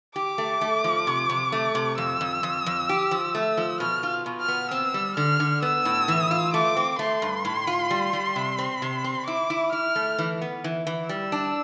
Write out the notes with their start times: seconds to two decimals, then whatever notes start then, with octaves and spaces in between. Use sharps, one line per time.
0.16 G4 D6
0.38 A3
0.61 A3
0.84 F3
1.07 C3
1.30 C3
1.52 A3
1.75 C3
1.98 F2 E6
2.21 F2
2.43 F2
2.66 F2
2.89 G4
3.11 F3
3.35 A3
3.57 F3
3.80 B2 F6
4.03 F4
4.26 B2
4.41 F6
4.48 B3
4.71 C4 E6
4.94 G3
5.17 D3 F6
5.40 D3
5.62 B3 E6
5.85 A2
6.08 E3
6.31 F4
6.54 A3 D6
6.77 C4
6.99 A3 C6
7.22 G2
7.45 A2
7.67 F4
7.91 G3
8.13 G3
8.36 C3
8.59 C4
8.82 C3
9.04 C4
9.27 E4 D6
9.50 E4
9.72 E4 F6
9.96 A3
10.18 E3
10.42 B3
10.64 E3
10.87 E3
11.09 G3 E6
11.32 D4